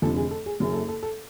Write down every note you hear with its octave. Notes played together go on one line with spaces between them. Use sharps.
F1 F2 D3 A4
G#4
A4
G#4
F#1 F#2 C#3
A4
A4
A4